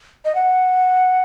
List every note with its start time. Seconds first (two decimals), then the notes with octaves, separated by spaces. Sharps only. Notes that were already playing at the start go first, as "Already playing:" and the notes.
0.25 D#5
0.35 F#5